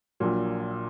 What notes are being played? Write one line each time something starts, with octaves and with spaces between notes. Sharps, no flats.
A#1 A#2 F#3